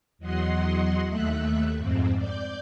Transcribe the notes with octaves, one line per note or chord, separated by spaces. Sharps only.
E2 F#3 D#5 F#5 C6
D#2 A3 E5 F#6
F2 G#2 C4
D5 G6